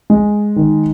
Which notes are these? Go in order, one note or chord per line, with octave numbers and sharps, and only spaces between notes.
G#3
D#3